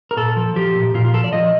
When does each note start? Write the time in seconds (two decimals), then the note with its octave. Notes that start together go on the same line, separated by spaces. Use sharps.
0.11 A#4
0.17 A#2 A4
0.36 F3
0.56 F3 G4
0.75 A#2
0.94 A#2 F4
1.05 F4
1.13 F3 A4
1.24 D5
1.33 F3 D#5